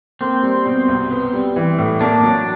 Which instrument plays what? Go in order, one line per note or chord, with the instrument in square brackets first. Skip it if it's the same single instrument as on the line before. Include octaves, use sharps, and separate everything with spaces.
[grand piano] A#3 [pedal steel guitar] C4
[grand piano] G3
B2
C2
B3
G3
E3
A2
[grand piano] A#3 [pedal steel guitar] D4
[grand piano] F#3